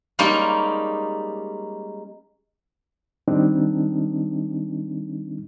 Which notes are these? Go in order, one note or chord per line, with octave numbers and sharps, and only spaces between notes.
G3 G#3 A#3 C#4 D#4 G4
D#3 G3 C4 D4 D#4